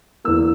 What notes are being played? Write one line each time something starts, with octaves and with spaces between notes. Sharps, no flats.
E2 E3 A#3 E6